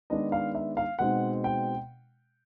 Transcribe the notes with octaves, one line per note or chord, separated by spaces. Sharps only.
D#3 G#3 B3 D4 D#5
F5
E5
F5
B2 G#3 C4 D#4 F#5
G5